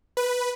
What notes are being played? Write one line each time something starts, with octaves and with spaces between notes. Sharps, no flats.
B4